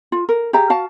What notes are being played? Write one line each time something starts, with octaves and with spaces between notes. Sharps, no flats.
F4
A#4
G4 G#4 E5 A#5
F#4 F5 A5